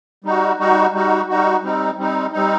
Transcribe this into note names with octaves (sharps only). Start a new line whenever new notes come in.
G3 D#4 F#4
G3 D#4 F#4
G3 D#4 F#4
G3 D#4 F#4
G3 C4 D#4
G3 C4 D#4
G3 C4 D#4